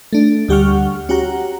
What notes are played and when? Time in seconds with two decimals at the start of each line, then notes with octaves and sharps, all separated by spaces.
0.13 A3 D4
0.48 D2 G3 G4 F#5 C#6 F6
1.09 C#4 F#4 G4 F#5 A#5